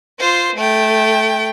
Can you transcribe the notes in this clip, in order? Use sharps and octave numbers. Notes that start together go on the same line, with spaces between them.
F4 C5
A3 G5